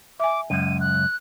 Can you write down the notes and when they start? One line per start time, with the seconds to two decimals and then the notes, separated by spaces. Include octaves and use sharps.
0.20 E5 G#5 D6
0.50 C#2 F#2 D#7
0.80 F#6